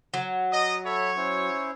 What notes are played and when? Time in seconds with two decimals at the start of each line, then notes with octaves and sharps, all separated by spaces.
0.14 F#3
0.52 D#5 A#5
0.85 A4 C#5 E5 B5
1.16 C#4 E4 C5